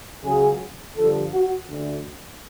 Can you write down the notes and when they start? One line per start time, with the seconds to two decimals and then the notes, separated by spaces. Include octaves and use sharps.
0.24 C#2 C#3 F#3 G#4
0.96 G2 D3 F3 A4
1.33 F#4
1.69 D2